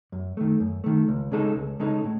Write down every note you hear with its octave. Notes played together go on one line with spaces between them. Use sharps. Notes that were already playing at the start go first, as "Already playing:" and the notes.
F#2
D#3 A3
F#2
D#3 A3
C#2
C#3 G#3 D#4 A4
C#2
C#3 G#3 D#4 A4
A2